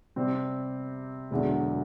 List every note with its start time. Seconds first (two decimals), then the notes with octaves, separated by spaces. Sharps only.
0.16 C3 G3 C4
1.31 E1 E2 D3 F#3